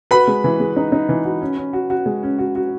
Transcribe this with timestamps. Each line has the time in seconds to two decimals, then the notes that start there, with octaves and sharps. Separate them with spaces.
0.11 F#4 B4 B5
0.27 G#3
0.44 E3
0.60 G#3
0.76 D#4
0.92 D#4
1.09 E3
1.25 F#4
1.41 C#4
1.57 C#4
1.73 F#4
1.90 F#4
2.06 G#3
2.23 C#4
2.39 F#4
2.55 F#4